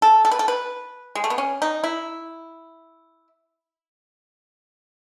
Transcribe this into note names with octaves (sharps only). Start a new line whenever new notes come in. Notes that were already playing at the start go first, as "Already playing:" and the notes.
A4
A4
B4
A4
B4
G#3
A3
B3
C#4
D#4
E4